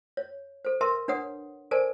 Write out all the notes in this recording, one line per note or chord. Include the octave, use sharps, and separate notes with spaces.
C#5
A4 C5
A#4 B4 E5 A5 C6
D4 B4 C#5 F#5 D#6
A4 A#4 C5 D5 G#5 A5